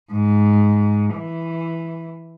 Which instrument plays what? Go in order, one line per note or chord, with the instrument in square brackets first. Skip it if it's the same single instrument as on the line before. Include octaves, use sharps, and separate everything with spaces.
[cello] G#2
E3